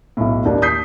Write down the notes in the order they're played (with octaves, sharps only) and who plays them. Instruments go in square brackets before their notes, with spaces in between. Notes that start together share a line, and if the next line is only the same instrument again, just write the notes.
[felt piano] B1 A2
D#2 D4
D#6 G6 B6 C7